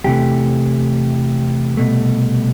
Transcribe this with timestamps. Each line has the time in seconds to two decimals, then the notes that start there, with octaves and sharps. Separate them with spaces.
0.04 E2 C3 E3 A3 G4
1.77 C2 B2 A3